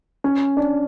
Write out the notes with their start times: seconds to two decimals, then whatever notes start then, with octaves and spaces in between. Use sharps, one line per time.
0.24 C#4
0.57 D4